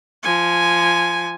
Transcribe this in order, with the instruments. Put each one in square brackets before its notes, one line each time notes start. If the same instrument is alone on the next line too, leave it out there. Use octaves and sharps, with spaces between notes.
[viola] F3 G#5